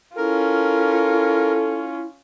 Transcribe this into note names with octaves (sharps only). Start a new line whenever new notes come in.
C#4 E4 F4 A4 A#4